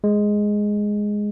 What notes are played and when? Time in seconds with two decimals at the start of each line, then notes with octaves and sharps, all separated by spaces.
0.04 G#3